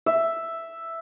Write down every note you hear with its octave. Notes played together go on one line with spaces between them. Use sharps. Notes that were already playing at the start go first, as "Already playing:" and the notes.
E5